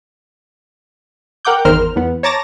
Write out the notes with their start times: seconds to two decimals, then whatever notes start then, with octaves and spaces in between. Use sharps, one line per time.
1.45 A#4 F#5 G5 D6 G6
1.65 G#1 E2 D#3 A#4 C5 F6
1.96 E2 B3
2.23 C#5 A5 A#5 D6 A6 A#6